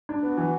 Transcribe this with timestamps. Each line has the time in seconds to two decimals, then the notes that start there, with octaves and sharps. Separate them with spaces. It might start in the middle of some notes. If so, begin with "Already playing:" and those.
0.09 D4
0.23 B3 F#4
0.38 E3